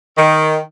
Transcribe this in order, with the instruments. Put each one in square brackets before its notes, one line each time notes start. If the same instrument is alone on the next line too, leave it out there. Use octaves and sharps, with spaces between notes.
[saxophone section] D#3